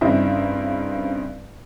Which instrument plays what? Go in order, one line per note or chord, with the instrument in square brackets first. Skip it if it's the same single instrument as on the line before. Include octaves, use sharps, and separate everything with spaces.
[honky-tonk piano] G2 C#3 C4 D#4 E4 E5